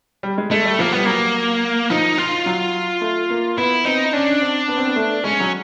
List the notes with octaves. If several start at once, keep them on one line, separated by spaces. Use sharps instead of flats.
G3
G#3
G#3 A3
G3
F3 A#3
G3 B3
F#3 A#3
F3 D#4
F4
F#3
A3
A#3
B3 E4
C4 D#4
C#4 D4
C4
B3
C4
B3
A3
G#3 C#4
F#3